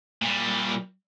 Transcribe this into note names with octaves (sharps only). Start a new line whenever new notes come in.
A#2 G3